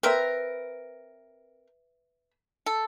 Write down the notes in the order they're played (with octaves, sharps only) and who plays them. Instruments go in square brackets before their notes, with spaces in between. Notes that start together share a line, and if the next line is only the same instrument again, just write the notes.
[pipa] C4 A#4 [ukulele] B4 E5
[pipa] A4